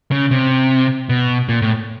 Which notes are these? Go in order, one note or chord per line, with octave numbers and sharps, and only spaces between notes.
C#3
C3
B2
A#2
A2